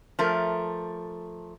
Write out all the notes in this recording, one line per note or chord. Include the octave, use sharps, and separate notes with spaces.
F3 A3 A#4